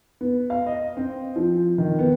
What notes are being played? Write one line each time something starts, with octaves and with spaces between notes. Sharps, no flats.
B3
F5
D#5
C4
F3
D#3
B3